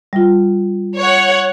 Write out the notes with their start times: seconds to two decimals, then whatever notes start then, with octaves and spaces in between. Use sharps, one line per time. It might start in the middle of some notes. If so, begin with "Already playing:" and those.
0.13 G3 F4
0.98 C#5 F#5